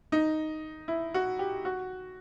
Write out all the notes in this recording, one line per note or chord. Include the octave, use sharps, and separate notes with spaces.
D#4
E4
F#4
G4
F#4